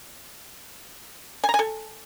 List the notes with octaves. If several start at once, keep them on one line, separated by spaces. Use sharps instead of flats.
G#5
A#5
G#5
A4